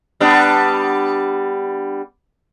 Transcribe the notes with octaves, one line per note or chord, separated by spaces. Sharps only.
G3 B3 D4